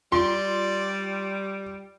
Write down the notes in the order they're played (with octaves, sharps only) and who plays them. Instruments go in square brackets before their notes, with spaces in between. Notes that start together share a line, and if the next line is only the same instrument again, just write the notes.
[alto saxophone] G3 [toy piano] F4 [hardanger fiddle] D5 [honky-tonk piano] C6